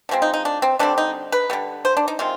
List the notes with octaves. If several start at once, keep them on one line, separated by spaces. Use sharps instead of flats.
D3 F3 G#3 C4
D#4
D#4
D4
C4
D3 G3 C4 D4
D#4
B4
D3 G3 B3
C5
D4
D#4
C3 D#3 G#3 C4 F4